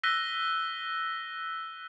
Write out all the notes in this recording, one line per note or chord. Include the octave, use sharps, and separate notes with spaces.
E6 F#6 A#6 B6 D#7 G7